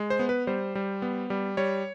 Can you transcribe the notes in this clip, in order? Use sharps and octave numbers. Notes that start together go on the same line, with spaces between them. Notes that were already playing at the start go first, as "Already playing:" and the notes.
Already playing: G#3
C5
B3
B4
G3 C5
G3
B3
G3
G3 C#5